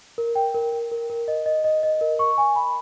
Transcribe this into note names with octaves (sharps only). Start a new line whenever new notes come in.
A#4
G5
A#4
A#4
A#4
A#4
D#5
D#5
D#5
D#5
A#4
C#6
G#5
B5